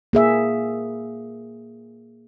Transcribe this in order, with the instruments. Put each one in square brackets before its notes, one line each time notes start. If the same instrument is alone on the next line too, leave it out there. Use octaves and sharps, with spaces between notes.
[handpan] A#3 G#4 E5